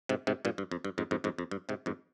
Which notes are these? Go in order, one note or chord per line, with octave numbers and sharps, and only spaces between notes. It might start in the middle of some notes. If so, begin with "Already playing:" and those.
G#2 C3
G#2 C3
G2 A#2
G2
F2
G2
F2 G#2
F2 G#2
F2 G#2
F2
G2
G#2 C3
F2 G#2